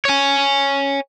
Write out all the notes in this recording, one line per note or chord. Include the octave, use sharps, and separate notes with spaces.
C#5 G#5